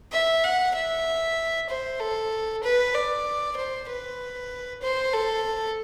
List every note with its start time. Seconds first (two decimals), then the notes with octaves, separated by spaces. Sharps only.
0.12 E5
0.44 F#5
0.75 E5
1.69 C5
2.00 A4
2.63 B4
2.94 D5
3.56 C5
3.89 B4
4.82 C5
5.13 A4